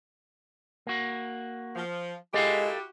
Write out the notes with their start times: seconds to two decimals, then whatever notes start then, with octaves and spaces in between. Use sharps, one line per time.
0.87 A#3 F#4
1.76 F3
2.34 G#3 E4 F#4 G4 A4 F5 G5